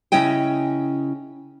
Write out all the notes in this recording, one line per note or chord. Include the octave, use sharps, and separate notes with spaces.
C#3 C#4 E4 C#5 D#5 G5